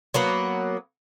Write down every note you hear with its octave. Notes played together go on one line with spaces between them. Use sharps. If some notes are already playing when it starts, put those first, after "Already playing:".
F#3 A#3 B3